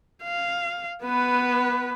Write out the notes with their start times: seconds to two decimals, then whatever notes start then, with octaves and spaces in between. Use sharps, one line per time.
0.23 F5
1.03 B3 B4